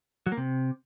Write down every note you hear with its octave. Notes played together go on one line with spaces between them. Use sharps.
F#3
A#3
C3